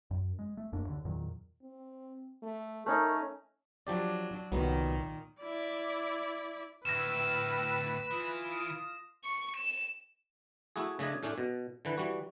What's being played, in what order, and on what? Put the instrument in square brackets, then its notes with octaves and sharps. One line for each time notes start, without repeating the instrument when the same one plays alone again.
[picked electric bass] F#2
G#3
A3
E1 F#2 A#3 D4
D#2 D3
E2 A#2 D#3 F#3
[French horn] C4
A3
[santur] A3 C#4 D#4 [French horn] A#4
[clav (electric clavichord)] F3 G4 D5 [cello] F#3 D4
[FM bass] C2 [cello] A#2 D#3 [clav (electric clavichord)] F#3 B3
[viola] E4 D5
[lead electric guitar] D2 A2 [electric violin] B4 [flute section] G5 E6 F6 [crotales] A#6 E7
[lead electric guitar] E3 [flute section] F4 D#6
[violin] C#6
E7
[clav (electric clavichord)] A3 E4 F#4 G#4
C#3 A3 D4 D#5 G#5
A2 A3 C#4 D4
B2
D3 E3 B4
E3 G3 F#4